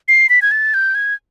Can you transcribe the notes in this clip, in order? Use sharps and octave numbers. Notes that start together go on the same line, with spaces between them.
C7
B6
G#6
A6
G6
G#6